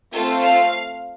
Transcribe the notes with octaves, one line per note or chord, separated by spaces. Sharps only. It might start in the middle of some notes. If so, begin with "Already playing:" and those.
A3 C4 F4 A4
F5